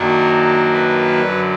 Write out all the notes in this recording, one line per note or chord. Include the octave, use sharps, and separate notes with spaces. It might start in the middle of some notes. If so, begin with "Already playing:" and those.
Already playing: F#2 D#3 F#3 A#3 D4 C#5
B4
F#2 D3 F#3